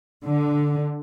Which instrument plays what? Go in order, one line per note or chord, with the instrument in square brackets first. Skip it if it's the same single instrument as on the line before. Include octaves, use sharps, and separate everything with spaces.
[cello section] D3